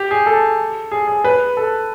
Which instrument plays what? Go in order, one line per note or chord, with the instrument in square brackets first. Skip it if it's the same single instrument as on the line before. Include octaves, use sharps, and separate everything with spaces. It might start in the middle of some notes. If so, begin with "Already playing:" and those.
Already playing: [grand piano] G4
G#4
A4
G#4
G#4
B4
A4